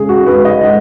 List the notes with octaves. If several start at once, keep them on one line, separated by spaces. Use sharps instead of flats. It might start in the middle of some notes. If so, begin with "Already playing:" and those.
Already playing: C#3 G#3 G#4
F#4
G#3 B4
D#5
G#3 F#5